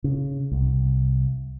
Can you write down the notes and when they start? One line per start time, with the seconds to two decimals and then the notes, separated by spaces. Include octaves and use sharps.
0.04 C#3
0.51 C2